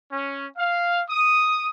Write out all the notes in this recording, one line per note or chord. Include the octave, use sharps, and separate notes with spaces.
C#4
F5
D#6